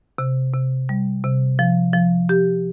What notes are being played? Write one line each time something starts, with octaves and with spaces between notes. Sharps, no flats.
C3
C3
G3
C3
F3
F3
G4